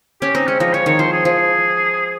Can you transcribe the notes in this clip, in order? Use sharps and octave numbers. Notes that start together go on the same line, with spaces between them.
C#4 G4
C4 D#4
G#3 C#4
F3 D#4
F3 C#5
D#3 C#5
F3 C5
G#4
F3 G#4